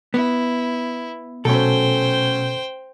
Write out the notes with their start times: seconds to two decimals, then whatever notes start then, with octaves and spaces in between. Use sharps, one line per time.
0.14 B3 E4
1.45 B2 F#3 A3 C#4 A4 C5 G5